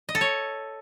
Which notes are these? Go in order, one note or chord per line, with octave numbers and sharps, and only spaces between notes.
D#5
A4
C#5